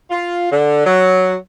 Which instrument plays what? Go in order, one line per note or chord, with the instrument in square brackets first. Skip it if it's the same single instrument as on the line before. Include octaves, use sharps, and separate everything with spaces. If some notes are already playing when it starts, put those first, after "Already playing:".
[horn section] F4
D3
F#3